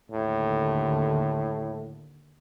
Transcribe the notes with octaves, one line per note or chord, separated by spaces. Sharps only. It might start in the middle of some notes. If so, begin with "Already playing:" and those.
D#2 A2 D3